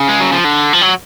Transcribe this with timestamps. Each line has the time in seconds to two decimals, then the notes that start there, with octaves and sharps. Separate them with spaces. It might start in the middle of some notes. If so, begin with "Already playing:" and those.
Already playing: C#3
0.09 G#3
0.20 F#3
0.32 F3
0.44 D3
0.73 F3
0.82 F#3